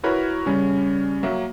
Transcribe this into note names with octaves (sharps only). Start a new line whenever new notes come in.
E4 F#4 A#4 B4 C#5 B5
C#3 G3 C#4
F#3 A#3 E5